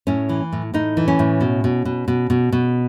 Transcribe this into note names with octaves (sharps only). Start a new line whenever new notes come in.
A2 C#4
E3
A2
A2 D#4
E3
C#4
A2
B2
B2
B2
B2
B2
B2